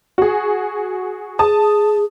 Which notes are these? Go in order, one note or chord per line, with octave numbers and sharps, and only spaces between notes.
F#4 G#4
G#4 A5 D#6